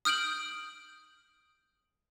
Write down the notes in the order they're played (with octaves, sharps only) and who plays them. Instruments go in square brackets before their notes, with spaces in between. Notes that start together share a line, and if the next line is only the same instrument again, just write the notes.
[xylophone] D#6 F6 G6 D7 F#7